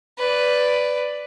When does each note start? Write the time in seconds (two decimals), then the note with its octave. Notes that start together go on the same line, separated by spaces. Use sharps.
0.18 B4 D5